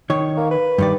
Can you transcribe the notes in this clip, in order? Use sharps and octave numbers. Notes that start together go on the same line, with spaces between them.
D#3 C#5
A#3
B4
G2 D#3 D5